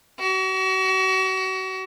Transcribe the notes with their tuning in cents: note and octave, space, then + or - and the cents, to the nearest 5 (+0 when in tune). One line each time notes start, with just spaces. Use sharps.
F#4 +35